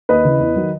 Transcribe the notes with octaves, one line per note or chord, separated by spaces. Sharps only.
D#2 B4 D#5
C#3 E3
E2
D#3 F#3